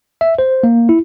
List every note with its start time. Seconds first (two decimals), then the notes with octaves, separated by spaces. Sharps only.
0.21 E5
0.39 C5
0.63 A#3
0.89 E4